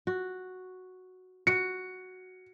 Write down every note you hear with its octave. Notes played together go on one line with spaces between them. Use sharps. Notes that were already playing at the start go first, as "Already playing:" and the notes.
F#4
F#4 C#7